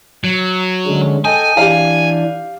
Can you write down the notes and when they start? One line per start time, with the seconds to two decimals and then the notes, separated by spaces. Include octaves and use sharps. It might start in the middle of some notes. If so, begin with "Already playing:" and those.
0.24 F#3
0.87 D3 G#3 C#4
1.25 A4 D#5 G5 G#5
1.57 E3 D4 G4 F5